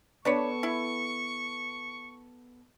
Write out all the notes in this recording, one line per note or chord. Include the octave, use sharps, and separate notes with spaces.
B3 D4 A4 B4 C#5 C#6
E4